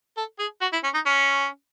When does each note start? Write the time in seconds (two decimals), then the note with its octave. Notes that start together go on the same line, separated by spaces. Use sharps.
0.17 A4
0.39 G#4
0.61 F#4
0.73 E4
0.84 C#4
0.94 D#4
1.06 C#4